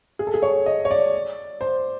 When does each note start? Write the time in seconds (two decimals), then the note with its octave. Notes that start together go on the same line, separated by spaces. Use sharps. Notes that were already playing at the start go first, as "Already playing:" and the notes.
0.19 G#4
0.27 A4
0.34 G#4
0.42 C#5
0.66 D#5
0.85 C#5
0.91 D5
1.61 C5